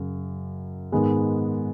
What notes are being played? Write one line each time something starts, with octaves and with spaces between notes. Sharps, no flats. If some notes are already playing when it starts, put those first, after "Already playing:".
Already playing: F#2 C#3 F#3
G#2 D#3 G#3 B3